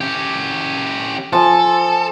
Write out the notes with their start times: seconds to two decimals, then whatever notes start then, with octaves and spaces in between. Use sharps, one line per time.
0.01 C#4 G4
1.33 F3 A4 G#5